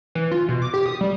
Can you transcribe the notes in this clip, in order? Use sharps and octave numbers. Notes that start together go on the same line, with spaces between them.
E3
F4
B2
D6
G4
D#6
G3